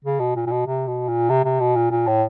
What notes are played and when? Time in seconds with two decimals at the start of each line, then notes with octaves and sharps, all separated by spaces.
0.05 C#3
0.20 B2
0.36 A#2
0.47 A#2
0.51 B2
0.67 C3
0.87 B2
1.08 A#2
1.29 C3
1.44 C3
1.60 B2
1.76 A#2
1.91 A#2
2.07 A2